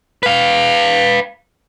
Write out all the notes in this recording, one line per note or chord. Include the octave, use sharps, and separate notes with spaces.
B4 F5